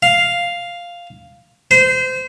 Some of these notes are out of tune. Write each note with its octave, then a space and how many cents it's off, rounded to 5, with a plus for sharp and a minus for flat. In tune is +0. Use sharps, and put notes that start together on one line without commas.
F5 +0
C5 -25